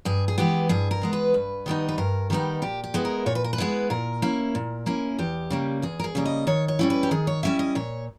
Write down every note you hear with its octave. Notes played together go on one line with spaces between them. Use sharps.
G2 G#4
G#4
E3 G#3 B3 G4
G2 G#4
A#4
E3 G#3 B3
B4
G2
D#3 G3 B3 D#4
B4
G2 A#4
D#3 G3 B3 D#4 G4
A#2 G4
G4
G#3 B3 E4
A#4
A#2 C#5
B4
A#4
B4
G#3 B3 E4
A#2 A#4
A#3 C#4 E4
A#2
A#3 C#4 E4
E2 G4
C#3 G3 A#3
E2 G#4
A#4
G#4
C#3 G3 A#3
D#5
D#3 C#5
C#5
G3 C#4 E4
B4
G4
D#3 G#4
C#5
G3 C#4 E4 E5
D#5
A#2 C#5